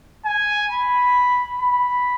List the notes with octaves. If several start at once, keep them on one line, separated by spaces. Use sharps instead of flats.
G#5
B5
B5